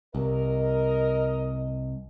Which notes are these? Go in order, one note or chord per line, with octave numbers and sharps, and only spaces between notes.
C2 A#4 D#5